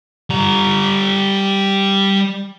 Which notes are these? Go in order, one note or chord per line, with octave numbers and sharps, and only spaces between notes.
G3 A#5